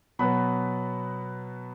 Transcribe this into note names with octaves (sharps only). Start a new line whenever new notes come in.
B2 F#3 B3 B5